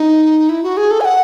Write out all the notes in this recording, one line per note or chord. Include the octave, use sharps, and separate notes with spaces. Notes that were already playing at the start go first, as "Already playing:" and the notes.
Already playing: D#4
E4
F#4
G#4
A4
G#5
F#5